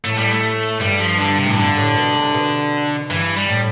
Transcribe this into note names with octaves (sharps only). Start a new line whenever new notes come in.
A2 A3
G3
A3
G2 G3
F3
D3
C3
A2 E3
G2 D3
A2
B2
C3
B2
G2 E3
G3
A2